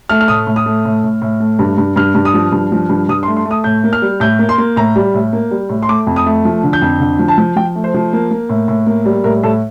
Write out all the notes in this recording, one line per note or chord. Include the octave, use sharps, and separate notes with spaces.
A3 F6
F6
A2 D#6
A2
D#6
A3
A2
A2
A2
A3
G2
G2
G2 F6
G2
D#6
F3
G2
F3
G2
G2 D#6
C6
A3
C6
A3
D#6
A2 G6
A#3
F6
G3
A2 G6
A#3
C6
A#3
A2 A#5
G3
A2
A#3
G3
A2
C6
A3 D6
F2
D#6
A3
F3
D3
G6
F2
D3
F3
A5
F3
F3 G5
A3
C5
F3
A#3
A#3
A2
A2
A#3
G3
A2 A#4
A2 A4